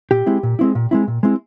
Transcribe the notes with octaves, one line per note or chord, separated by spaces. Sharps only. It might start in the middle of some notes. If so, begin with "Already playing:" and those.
A#2 G4
G#3 C4 E4
A#2
G#3 C4 E4
A#2
G#3 C4 E4
A#2
G#3 C4 E4